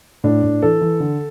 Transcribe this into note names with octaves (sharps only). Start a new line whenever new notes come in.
A2 D4
A2
E3 A4
E3
D3